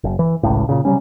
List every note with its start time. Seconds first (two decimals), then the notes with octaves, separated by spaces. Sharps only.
0.04 F#1
0.19 E3
0.43 G#1 C#2 A2
0.69 A#2 C#3
0.85 C3 F#3 G3 C#4